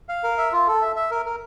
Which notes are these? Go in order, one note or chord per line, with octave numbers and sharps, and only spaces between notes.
F5
A#4
E5
F4
A4
E5
E5
A#4
A#4